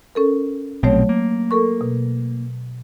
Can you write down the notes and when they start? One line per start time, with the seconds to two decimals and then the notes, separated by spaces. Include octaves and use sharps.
0.15 C#4 A4 A#4
0.83 A#1 B2 F#3 A3 C4 C#5
1.09 A#3
1.51 A4 A#4 C#6
1.81 B2